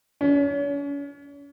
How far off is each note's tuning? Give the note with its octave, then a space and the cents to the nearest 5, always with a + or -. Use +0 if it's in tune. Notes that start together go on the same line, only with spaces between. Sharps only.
C#4 +40